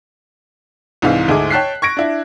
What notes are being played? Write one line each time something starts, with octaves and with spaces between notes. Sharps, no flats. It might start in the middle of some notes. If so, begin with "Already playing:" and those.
C2 G#2 E3 F5
D2 G#2 E4 G#4 D6
C#5 G5 A5 F#6 B6 C7
C#6 G#6 A#6 D7
D4 E4